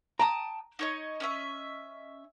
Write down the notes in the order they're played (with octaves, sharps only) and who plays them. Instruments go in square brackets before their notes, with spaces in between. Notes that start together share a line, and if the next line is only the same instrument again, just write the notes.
[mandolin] G5 A5 D#6 [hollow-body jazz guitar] A#5
[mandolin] D#4 C#5 D#5
C#4 D#5 E5